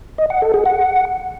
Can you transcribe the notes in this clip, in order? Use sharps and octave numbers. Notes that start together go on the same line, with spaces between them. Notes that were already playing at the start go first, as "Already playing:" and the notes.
D#5
F#5
A4
G#4
F#5